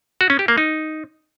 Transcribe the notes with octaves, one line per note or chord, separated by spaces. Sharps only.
F#4
C#4
G4
A#3
D#4